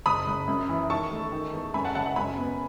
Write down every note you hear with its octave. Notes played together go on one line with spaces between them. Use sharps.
F#1 B5 D#6
F#1
F#2
E3
D#3 A5 C#6
A3
D#3
E2
F#2 G#5 B5
F#5 A5
F#1 F#5 A5
F#5 A5
F#2 G#5 B5
B3